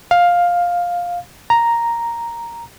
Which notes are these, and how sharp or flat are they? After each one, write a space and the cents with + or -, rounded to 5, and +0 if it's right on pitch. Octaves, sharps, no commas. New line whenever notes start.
F5 +10
A#5 +0